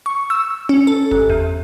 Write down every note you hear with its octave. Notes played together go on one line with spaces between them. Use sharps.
C#6
E6
C#4
A4
G1
E2